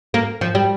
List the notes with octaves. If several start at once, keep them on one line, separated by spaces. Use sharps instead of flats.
A#3
F3
G3